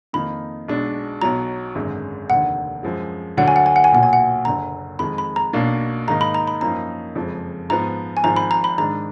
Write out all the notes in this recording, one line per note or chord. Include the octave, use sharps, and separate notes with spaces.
F2 D#3 A#3 D#4 B5
B1 B2 G#3 D4
B1 B2 F#3 A#5
G#1 F#2 D3 G#3
F1 D#2 D3 F#5
F#2 F3 G#3
D2 D3 F#3 D4 F#5
G#5
F#5
G#5
F#5
G#5
B1 A#2 F#3 F#5
G#5
F#5
F#1 F#2 D3 A#5
F2 D#3 G#3 B5
B5
A#5
B1 B2 A#3 D4
G#2 D#3 A#3 D#4 A#5
B5
A#5
B5
F#2 F3 A#3 D#4 A#5
F#1 F2 F3 G#3
G#2 F3 B3 A#5
G#5
G#1 G#2 F3 A#5
B5
A#5
B5
G#2 D#3 G#3 D4 A#5